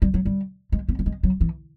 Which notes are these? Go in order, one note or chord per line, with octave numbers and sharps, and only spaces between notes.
G3
F#3
G3
G#3
B3
G3
G#3
F#3
E3